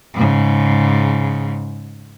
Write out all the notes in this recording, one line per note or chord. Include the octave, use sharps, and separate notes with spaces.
G#2 C#3